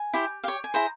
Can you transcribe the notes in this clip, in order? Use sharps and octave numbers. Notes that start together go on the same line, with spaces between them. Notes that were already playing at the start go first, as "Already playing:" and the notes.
Already playing: G#5
E4 G4 C5
G4 C#5 F5
G#5
E4 G#4 C5 A#5